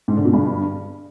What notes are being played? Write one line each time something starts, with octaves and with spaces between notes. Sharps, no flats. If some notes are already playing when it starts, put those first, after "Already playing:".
G#2
D3
B2
G2